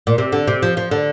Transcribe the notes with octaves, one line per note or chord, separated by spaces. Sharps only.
A#2
C3
D3
C3
F3
F3
D3